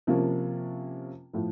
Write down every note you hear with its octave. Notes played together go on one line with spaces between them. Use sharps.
C3 F3 A#3 C#4 F4
A2 F3